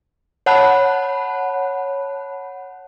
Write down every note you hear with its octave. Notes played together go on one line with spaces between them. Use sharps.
C#5 F#5 A5 B5 F#6